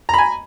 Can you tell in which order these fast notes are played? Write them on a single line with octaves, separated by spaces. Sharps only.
A#5 B5 G#5